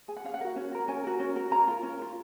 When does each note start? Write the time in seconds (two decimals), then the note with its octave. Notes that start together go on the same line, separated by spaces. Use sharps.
0.08 G#4 G#5
0.16 F#5
0.24 C#4 F5
0.34 F#5
0.41 F#4 A#4
0.56 C#4
0.72 F#4 A#4
0.88 C#4 G#5
1.04 F#4 A#4
1.20 C#4
1.36 F#4 A#4
1.51 C#4 A#5
1.68 F4 A#4
1.83 C#4
1.99 F4 A#4